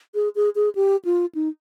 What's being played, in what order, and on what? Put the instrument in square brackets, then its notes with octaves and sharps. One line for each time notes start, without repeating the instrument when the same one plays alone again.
[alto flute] G#4
G#4
G#4
G4
F4
D#4